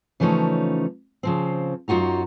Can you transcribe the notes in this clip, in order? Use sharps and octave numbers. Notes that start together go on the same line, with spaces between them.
C#3 E3 F3 A3 C#4 D#4
C#3 F3 C4
F#2 D#4 F4 F#4 A#5